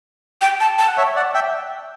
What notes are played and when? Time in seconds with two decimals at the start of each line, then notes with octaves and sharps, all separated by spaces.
0.41 G5
0.60 A5
0.79 A5
0.87 F#5
0.97 C#5 E5
1.16 D5 F#5
1.34 E5 G5